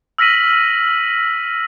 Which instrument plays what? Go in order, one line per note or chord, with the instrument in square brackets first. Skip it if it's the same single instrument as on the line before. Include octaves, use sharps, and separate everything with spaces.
[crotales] E6 F6 A#6 B6 D#7 F#7